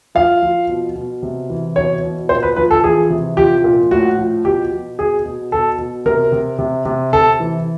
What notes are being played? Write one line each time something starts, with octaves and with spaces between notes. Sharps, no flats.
F3 F5
F3
B2
B2
C3
E3
B2 C#5
B2
A#2 C5
B4
F3 B4
A4
E3 G#4
C3
F3 G4
A#2
A2 F#4
F3
B2 G4
B2
B2 G#4
B2
B2 A4
B2
C3 A#4
C3
C3
C3
C3 A4
E3